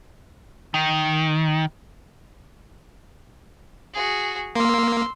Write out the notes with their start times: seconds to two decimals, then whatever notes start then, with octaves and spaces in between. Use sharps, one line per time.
0.74 D#3
3.93 F#4 G#4
4.55 A#3 C6 E6